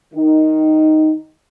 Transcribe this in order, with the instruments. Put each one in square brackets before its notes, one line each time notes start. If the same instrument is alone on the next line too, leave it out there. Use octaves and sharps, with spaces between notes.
[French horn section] D#3 D#4